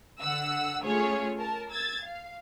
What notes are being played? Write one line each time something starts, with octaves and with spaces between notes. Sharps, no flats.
D3 F#5 E6
A3 C#4 F4 G#4 C#5
A#4 A5
E6 G#6 A6
F5